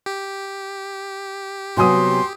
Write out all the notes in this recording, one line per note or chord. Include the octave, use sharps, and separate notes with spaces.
G4
C3 F#3 B3 F#4 G#5 C6 D#6